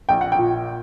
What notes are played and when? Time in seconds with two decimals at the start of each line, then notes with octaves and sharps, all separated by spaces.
0.09 A#1 G5
0.21 F#5
0.32 G5
0.38 A#2